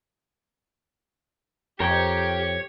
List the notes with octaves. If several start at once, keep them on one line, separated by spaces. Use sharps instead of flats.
F2 G4 A#4 C#5 G5